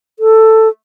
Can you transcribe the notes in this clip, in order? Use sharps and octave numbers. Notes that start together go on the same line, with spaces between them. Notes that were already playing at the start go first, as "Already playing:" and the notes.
A4